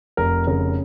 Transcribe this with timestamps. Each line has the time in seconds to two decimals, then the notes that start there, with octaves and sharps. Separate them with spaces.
0.17 F1 A#4
0.47 C#3 A#4